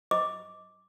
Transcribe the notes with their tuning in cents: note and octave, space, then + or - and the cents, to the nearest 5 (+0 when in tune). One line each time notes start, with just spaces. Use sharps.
D#5 +15 D6 +0